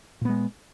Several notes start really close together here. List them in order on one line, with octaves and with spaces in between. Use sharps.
A#2 B3 G#3